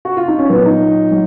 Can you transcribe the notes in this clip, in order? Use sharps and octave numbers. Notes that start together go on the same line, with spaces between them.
F#4
F4
D#4
C#4
A#2 F#3 B3
D#4
F#3